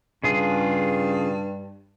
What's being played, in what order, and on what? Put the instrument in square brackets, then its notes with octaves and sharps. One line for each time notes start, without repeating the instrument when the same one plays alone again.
[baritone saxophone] G2 [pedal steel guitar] C#3 F4 G#4